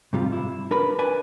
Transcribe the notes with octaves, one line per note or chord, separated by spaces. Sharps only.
G#2 C3 G3 F4
E4
D4 A#4 B4 B5
B4 D5 G#5